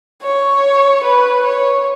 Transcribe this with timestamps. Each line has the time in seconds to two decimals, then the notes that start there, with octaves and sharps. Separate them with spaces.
0.22 C#5
1.03 B4
1.43 C#5